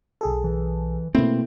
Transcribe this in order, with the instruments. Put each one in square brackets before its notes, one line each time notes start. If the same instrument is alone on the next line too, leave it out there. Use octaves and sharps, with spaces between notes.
[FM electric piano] B1 G#4 A4
[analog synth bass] E3
[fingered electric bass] B2 C4 [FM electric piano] A3 A#3 E4